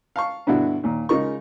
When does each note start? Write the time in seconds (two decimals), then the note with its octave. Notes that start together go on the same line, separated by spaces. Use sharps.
0.16 F5 A5 C#6
0.47 G2 B2 D3 D4 E4 F#4
0.83 D#2 A#2
1.09 C#3 G#3 D#4 F4 A#4 C#6